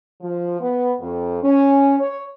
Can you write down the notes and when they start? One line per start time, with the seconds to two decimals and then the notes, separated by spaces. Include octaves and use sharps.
0.22 F3
0.60 B3
1.01 F2
1.43 C#4
2.00 C#5